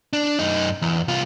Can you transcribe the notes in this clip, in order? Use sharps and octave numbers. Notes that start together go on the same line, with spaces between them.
D4
F#2 D#4
E2
C2 F4